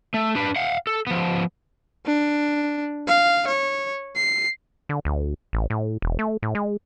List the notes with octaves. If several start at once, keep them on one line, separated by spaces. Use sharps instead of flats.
A3
D4 B4
F5 F#5
A4
F3 B3
D4
F5
C#5
C7
D3
D2
A1
A2
E1
A3
A2
G#3